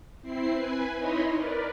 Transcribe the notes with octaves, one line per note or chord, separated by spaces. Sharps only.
C4 E4 C7
B4 G#5
D#4 E4 C#5 D#5 B5 C6
A#4 B4 D5